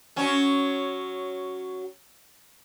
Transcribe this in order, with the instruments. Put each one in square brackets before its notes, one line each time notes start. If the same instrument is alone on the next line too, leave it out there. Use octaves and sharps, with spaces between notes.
[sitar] F#3 C#4